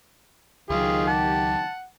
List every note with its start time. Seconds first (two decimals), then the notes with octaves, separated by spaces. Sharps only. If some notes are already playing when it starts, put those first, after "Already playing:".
0.70 C#2 D#3 F#3 F4 G4 G#4
1.08 F#5 A5